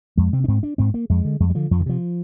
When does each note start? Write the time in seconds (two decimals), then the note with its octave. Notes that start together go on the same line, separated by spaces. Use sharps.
0.17 F2 G#3
0.33 C3 C4
0.44 D4
0.48 G#2 C4
0.63 D4
0.78 G#2 C4
0.94 A#3
1.10 F2 G#3
1.25 D3
1.40 F2 G#3
1.50 G3
1.55 D3 F3
1.71 F2 F3
1.80 D#3
1.86 C3 F3